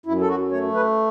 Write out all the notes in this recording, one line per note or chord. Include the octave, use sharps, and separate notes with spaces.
F#2 E4
A4
F#4
A3 C#5
B4